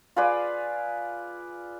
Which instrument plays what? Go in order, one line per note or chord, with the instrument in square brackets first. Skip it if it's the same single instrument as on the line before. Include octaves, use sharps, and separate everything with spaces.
[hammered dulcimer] F4 G#4 B4 D5